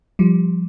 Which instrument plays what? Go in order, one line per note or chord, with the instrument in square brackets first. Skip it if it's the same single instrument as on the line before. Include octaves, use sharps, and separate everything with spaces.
[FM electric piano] F3 G3